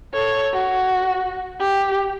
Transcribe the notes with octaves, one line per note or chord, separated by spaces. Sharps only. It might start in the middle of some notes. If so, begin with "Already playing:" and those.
A4 C#5
F#4
G4